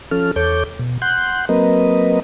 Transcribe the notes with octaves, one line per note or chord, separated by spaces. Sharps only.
F3 C#4 A4 F6
E2 A4 C#5 D6 G6
B2
F#5 C6 F#6 G6
F#3 A#3 C4 A#4 B4 D#5